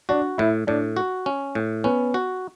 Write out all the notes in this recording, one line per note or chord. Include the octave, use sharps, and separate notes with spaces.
D4 F#4
A2 E4
A2 D4
F#4
C#4
A2
B3 C#4
F#4